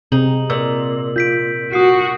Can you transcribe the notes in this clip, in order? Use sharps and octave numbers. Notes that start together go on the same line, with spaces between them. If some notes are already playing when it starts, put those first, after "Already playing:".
C3 C4 D#4 G#4 F#7
A#2 E6 F#7
F4 G6 B6 D7
F#4 D#6 C7